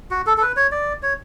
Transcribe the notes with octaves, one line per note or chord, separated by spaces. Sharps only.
F#4
A4
A4
B4
C#5
D5
C#5